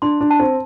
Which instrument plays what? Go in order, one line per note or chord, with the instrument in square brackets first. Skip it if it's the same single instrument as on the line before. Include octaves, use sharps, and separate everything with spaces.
[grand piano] D4 [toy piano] C6
[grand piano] D4
[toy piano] A5
[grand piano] C4